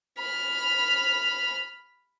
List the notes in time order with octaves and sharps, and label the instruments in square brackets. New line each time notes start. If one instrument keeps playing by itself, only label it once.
[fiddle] B5 F6